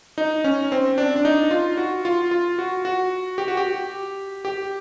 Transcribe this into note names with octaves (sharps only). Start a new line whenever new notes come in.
D#4
C#4
C4
D4
D4
D#4
F4
F#4
F4
F4
F#4
F#4
G4
F#4
G4
G4